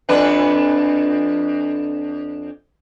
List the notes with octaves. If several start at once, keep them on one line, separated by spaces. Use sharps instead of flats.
F2 D4 B4